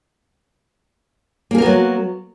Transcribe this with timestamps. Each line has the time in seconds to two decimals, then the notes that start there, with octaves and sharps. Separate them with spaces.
1.51 A#3
1.55 G#4
1.58 A#4
1.62 B3
1.66 F#3